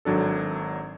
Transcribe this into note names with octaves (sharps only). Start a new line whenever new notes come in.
G#1 F#3 D4 A4